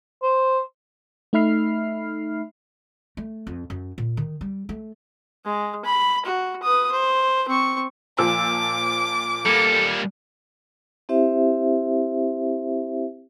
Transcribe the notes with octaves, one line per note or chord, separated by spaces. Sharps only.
C5
A3 D#4 E5 B5 F6 C7
A3
F2
F#2
A#2
D#3
G3
A3
G#3
B5
F#4
B4 D#6
C5
C4 C#6
A#2 F3 D6 E6
G3 A#3 A4
C4 E4 G4 C5 E5